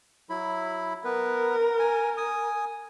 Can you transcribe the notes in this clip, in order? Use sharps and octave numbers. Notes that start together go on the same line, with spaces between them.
F#3 E4 B5
B3 A#4 B4
G#5
G#5 D#6